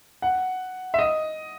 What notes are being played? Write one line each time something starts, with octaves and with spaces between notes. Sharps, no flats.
F#5
E5
D#5